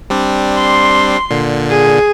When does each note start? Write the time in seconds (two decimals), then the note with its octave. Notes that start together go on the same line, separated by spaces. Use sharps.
0.10 G3 C4 D4
0.57 C6
1.30 A#2 D3
1.70 G#4